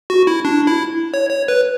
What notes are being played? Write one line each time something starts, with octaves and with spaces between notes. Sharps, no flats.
F#4
E4
D4
E4
C#5
C#5
B4